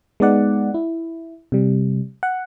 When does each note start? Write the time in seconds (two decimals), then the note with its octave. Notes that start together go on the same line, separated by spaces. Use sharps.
0.20 G#3 B3 D#4 D5 F#5
0.74 E4
1.52 C3 G3
2.23 F#5